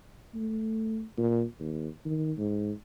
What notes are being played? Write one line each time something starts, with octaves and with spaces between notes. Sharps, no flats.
A3
A#2
D#2
D#3
G#2